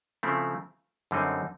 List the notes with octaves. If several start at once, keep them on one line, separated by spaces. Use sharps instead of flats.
C#3 F3 A3 C4 E4
F#2 D3 G3 C4 D#4